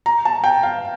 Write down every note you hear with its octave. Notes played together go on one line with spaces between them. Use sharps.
A#5
A5
G5
F5